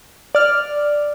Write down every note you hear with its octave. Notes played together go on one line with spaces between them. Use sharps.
D5 F6